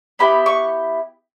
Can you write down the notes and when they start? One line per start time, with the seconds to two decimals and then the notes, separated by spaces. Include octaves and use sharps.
0.19 B3 E4 G4 B5
0.46 C#6